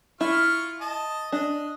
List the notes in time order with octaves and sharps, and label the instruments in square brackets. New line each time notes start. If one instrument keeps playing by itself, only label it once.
[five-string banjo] E4 [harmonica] F4 C#6 F6
[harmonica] D#5 A5
[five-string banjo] D4 [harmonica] D#5